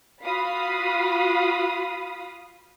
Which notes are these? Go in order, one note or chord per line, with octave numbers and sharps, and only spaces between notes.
F4 F#4 F5 B5 D#6